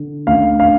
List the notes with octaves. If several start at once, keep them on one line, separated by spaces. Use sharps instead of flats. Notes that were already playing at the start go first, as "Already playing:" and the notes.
Already playing: D3
D2 D3 F5
F5